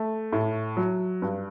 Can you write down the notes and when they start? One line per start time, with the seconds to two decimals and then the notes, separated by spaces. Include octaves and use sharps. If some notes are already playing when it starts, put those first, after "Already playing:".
Already playing: A3
0.33 A2
0.77 F#3
1.22 G2